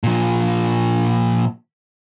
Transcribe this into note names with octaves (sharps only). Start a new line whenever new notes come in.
A#2 F3